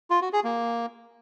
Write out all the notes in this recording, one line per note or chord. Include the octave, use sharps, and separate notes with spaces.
F4
F#4
G#4
A#3